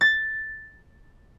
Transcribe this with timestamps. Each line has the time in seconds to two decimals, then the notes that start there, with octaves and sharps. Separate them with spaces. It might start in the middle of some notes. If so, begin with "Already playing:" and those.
0.01 A6